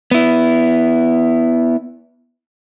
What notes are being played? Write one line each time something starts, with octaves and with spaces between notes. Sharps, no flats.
B3 E4